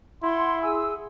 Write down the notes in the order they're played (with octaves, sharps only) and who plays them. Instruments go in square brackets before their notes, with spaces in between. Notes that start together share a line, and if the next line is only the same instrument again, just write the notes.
[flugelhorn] E4 [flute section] F#5 C6
[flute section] G#4 G#5 E6